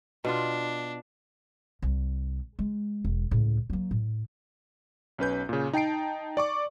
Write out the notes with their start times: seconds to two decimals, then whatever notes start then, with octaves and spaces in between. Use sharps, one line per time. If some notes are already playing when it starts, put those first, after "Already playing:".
0.25 B2 D4 F4
1.82 C2
2.59 G#3
3.05 E1
3.31 C#2 A2
3.70 F#3 A#3
3.91 A2
5.18 B1 C#4 B4 G6
5.49 A#2 C#3
5.73 D#4 G5 A5 C7 D7
6.37 D5 C#6 D6